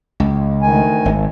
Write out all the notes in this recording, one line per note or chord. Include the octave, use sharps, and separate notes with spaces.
C#2
D2 D#3 G#5
G#1